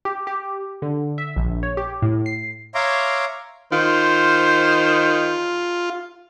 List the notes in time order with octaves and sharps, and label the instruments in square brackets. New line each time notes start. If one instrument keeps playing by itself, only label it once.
[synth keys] G4
G4
D3
E5
A#1
C#5
G4
A2
C7
[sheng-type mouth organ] C#5 E5 F5 A#5 C6 D6
[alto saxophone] D#3 [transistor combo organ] F4 [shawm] C5